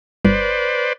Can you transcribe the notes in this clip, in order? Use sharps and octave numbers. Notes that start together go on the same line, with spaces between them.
G1 B4 C5 D5